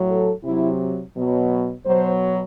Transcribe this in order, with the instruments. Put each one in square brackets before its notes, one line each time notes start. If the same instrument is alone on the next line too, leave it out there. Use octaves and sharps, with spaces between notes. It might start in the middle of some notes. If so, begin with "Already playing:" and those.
Already playing: [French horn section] A2 F#3
A4
C3 F#3 E4
B2 F#3
B2 F#3 C5